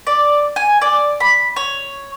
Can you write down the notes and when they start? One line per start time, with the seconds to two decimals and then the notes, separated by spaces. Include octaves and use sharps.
0.07 D5
0.56 G#5
0.82 D5
1.20 B5
1.56 C#5